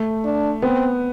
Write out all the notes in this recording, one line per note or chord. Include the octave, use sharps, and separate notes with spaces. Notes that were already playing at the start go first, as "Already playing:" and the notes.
Already playing: A3
D4
B3 C4